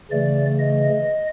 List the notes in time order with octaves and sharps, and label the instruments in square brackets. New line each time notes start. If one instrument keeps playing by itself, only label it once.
[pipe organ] C#3 E3 A3 D5
D#5